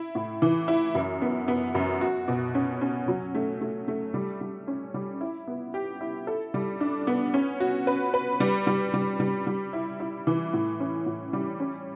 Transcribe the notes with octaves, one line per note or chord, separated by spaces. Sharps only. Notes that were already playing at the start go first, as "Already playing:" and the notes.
Already playing: E4
A2
E3
E4
F#2
B3
B3
F#2
F#4
B2
C#4
C#4
F#3
A3
A3
A3
G3
G3
C#4
G3
E4
B3
G4
E4
A4
G3
D4
B3
C#4
F#4
B4
B4
G3
G3
G3
G3
G3
E4
E4
E3
A2
C#4
A2
G3
C#4